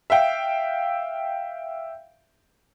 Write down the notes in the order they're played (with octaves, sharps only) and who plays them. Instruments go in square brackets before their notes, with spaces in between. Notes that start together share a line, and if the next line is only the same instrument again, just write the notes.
[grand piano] E5 F5 G5